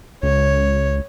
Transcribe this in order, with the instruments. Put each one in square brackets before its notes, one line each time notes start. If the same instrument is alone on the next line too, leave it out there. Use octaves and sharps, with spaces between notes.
[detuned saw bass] C#2 [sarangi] C#5